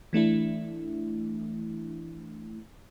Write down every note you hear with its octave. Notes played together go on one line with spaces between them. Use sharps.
E3 A3 D4 E4